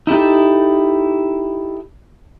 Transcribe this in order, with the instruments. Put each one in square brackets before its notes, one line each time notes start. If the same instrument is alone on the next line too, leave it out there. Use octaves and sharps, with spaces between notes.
[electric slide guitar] D#4 E4 G4 A4